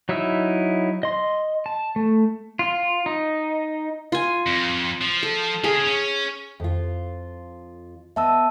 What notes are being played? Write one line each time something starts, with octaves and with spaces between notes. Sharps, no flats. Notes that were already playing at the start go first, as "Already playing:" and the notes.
F#3 D#4 E4 E5 E6
D#5 C6
A5
A3
F4
D#4
F4 G#5
F2
F3
A4
C#4 G#4 F5
C#4
F2 F4
B3 D#5 E5 A5 E6